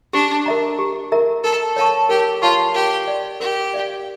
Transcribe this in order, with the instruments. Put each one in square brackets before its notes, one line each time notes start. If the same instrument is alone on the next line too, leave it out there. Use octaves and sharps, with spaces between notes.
[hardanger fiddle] D4 [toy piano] G4
[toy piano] A#4 E5 A#5
G4
A#4 E5 A#5
[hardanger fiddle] A4 [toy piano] A#4
[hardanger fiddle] A4 [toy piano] C#5 F5 A5 C#6
[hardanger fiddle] G4 [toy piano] A#4
[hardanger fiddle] F4 [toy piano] C#5 F5 A5 C#6
[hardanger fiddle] G4 [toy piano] A#4
[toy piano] D5 F5
[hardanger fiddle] G4 [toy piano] A#4
[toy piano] D5 F5